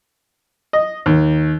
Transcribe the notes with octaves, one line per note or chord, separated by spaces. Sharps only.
D#5
D#2